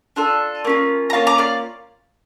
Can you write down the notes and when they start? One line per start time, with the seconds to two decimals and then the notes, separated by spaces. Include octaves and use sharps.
0.16 D4 F4 A4
0.65 A#3 C#4 F4
1.10 A#5
1.13 A#3 C#4 F4 F5 A5
1.27 A#5 D6
1.38 D5 F5